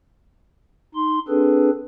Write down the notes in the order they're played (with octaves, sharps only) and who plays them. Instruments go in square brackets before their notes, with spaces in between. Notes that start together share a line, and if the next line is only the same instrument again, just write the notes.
[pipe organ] D#4 C6
C4 D4 G#4 A4 B4